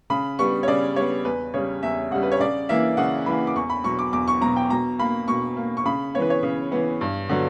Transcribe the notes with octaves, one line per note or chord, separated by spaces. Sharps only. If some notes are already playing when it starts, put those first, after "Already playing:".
C#3 B5
G3 B3 C#6
C#5
C#3 D5
G3 B3 C#5
E2 B4
C#3 G3 C#5
E2 E5
C#3 G3 F#5
B4
C#5
C#3 D5
E3 A#3 E5
C#3 F#5
E3 A#3 B5
D6
E2 C#6
B5
B2 F#3 C#6
D6
E2 D6
C#6
B2 F#3 A#5
G5
B2 A#5
A#3 B5
B2 C#6
A#3
C#6
C#3 B5
E3 B3 B4 C#5
C#5
C#3
E3 B3
G2
D3 F#3 B3